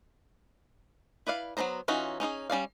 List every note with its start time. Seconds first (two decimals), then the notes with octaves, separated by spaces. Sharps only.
1.27 E4 B4 D5 F5
1.57 F#3 B3 D4 C5 A#5
1.88 E3 C#4 D#4 F4 F#4
2.20 C#4 D#4 F4 G#4
2.50 G3 C#4 D5 F5